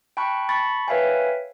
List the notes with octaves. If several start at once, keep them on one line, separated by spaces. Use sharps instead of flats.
G5 A5 B5 C#6 F#6
A5 B5 C#6 A6
B4 C#5 E5 F5 G5 G#5